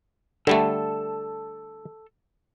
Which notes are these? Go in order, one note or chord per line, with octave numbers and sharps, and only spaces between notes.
D3 G3 A3 A4 A5